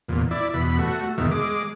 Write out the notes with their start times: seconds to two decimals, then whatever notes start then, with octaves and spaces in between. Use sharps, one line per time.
0.09 E2 A#2
0.31 E4 D5
0.54 E2 B2 B5
0.79 A3 F#4
1.18 D#2 G#2 B2 D#3 E5
1.31 G#3 D6